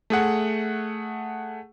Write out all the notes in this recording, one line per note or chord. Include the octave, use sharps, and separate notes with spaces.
A3 G#4 F#5